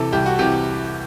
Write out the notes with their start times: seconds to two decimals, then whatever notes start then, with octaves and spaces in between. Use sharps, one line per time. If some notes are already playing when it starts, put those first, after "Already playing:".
Already playing: C3 E3 A4
0.13 C2 G4
0.26 F#4
0.39 C3 E3 G4